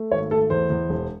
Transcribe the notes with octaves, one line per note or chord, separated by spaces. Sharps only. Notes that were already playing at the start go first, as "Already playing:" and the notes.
Already playing: A3
G#1 C#5
A3 A4
E2 C5
E2
E1